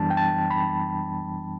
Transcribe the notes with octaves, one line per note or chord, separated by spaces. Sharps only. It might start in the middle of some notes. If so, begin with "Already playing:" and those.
Already playing: F#2 E3 G3 B3 D4 A5
G5
A5
B5